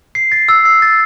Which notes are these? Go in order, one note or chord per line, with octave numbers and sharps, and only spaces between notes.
C7
A6
E6
C7
A6